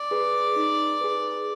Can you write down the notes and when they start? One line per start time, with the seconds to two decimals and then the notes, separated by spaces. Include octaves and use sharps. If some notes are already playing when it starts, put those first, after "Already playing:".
Already playing: D5
0.11 G#4 B4
0.56 D#4
1.01 G#4 B4